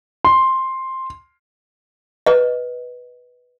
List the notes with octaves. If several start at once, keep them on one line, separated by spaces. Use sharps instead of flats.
C6
B4 D#5